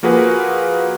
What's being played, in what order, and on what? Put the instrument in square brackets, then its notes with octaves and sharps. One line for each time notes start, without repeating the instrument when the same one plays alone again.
[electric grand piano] F3 A#3 F#4 G#4 B4